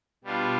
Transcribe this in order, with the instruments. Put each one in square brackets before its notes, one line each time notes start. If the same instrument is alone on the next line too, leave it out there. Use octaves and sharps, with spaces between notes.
[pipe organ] B2 G3 D4 F4